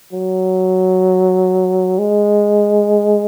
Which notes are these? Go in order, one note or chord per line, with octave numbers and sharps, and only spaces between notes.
F#3
G#3